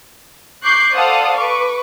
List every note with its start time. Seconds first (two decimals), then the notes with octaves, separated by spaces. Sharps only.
0.63 C#6 D6 F#6 G6 C7
0.95 A4 C5 D5 F5 F#5 D#6
1.38 B4 C#6 D6